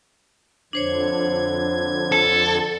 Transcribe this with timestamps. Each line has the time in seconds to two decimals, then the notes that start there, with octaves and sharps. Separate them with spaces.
0.73 F2 D3 D4 C5 C#5 G#6
2.12 A4